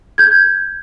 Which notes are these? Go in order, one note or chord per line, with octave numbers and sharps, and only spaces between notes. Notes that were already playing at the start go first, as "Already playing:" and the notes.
G6 G#6